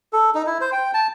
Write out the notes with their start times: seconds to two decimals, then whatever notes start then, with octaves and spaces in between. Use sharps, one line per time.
0.13 A4
0.35 D#4
0.47 E4
0.61 C5
0.72 G5
0.94 A5